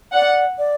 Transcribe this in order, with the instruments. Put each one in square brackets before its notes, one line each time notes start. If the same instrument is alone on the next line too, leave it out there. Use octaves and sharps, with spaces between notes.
[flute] D5 [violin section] F#5
[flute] D5